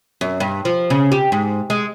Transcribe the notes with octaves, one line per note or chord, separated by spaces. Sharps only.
F#2
G2
F3
C#3
G4
G#2
G#3